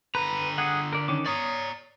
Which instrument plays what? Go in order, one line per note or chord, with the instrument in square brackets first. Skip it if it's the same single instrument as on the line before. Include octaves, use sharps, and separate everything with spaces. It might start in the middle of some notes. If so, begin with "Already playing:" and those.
[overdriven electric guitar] D3 A#5 [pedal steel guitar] B4
[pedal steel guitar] G#4 F#5
A#4 D5
D#3 C#4 D6
[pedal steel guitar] C#5 C#6 D#6 [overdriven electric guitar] D5 A#5